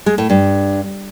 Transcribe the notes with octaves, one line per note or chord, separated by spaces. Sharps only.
G#3
A2
G2